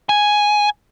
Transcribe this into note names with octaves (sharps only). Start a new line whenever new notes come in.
G#5